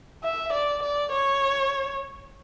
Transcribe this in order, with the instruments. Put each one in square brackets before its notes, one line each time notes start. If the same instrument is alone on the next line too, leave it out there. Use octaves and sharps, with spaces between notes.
[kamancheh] E5
D5
D5
C#5